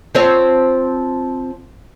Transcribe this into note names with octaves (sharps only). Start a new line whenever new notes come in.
F3 C4 C#5